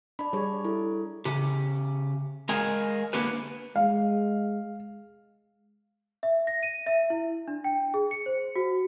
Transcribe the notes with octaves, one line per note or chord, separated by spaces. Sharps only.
D4 D5 B5
G3 G#4 C#5
E4 A4
C#3 G4
G#3 A#4 D#5 F5 G#5
D3 A#3 B3 G4 B4
G#3 F5
E5
A#6
D#7
E5
E4
D4
G5
G#4
C#7
C5
F#4